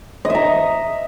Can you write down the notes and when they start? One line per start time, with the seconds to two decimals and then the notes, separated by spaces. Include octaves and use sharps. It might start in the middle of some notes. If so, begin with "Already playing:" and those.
0.25 D#5
0.30 E5
0.35 A#5